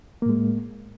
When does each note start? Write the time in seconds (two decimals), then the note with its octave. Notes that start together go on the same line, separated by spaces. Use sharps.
0.22 A#3
0.26 A2
0.29 G#3